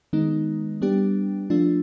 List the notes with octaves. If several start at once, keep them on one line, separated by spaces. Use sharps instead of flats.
D#3 G#3 B3 D#4
G3 B3 D4 G4
F3 A3 D4 F4